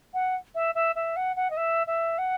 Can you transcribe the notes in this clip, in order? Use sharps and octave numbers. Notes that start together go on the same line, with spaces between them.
F#5
E5
E5
E5
F#5
F#5
D#5
E5
E5
F#5